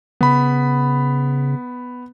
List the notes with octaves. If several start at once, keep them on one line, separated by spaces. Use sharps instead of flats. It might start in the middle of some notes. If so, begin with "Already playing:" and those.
C#3 B3 B5